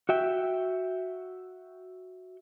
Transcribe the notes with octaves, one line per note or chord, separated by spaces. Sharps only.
F#4 E5 G5